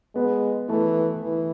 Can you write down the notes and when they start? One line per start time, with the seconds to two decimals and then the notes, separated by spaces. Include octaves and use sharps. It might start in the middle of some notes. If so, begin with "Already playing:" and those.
0.15 G#3 B3
0.69 E3 A3
1.22 E3